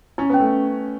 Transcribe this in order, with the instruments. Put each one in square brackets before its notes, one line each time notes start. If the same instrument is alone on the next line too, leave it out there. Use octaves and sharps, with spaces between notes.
[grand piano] C#4 [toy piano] E4
[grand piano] B3 [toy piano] C#4
[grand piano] A3